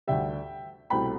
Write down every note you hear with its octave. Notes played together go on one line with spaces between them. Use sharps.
D2 D3 G3 E5 G5
C2 B2 A3 C4 G5 B5